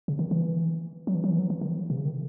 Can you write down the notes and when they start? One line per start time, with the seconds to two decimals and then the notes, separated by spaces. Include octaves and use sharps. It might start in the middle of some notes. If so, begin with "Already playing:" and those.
0.08 C#3
0.19 D#3
0.31 E3
1.07 F#3
1.15 E3
1.24 F#3
1.31 E3
1.39 F#3
1.50 E3
1.61 D#3
1.90 C3
1.97 C#3
2.05 D#3